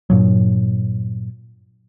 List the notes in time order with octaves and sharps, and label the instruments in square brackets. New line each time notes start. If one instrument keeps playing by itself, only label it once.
[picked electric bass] G2 A#2 F#3